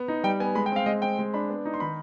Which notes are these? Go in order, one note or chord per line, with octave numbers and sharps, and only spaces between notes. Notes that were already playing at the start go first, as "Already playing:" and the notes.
Already playing: B3
D#4
G3 G5
B3 G#5
G#3 B5
G5
C4 F5
G#3 D#5
C4 G5
G#3
D4 B5
B3
D#4
C6
D#3 B5